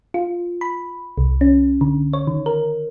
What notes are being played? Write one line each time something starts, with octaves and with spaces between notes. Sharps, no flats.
F4
B5
C2
C#4
D3
C#5
D#3
A#4